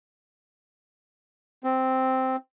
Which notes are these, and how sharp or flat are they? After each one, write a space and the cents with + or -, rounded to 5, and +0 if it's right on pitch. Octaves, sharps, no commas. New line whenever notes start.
C4 -5